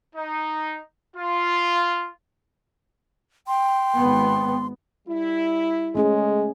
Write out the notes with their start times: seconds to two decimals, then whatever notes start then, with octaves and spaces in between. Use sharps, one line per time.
0.15 D#4
1.15 F4
3.47 G5 C6
3.96 G#1 B3
5.07 G3 E4
5.95 G#3 A3 C#4 G#4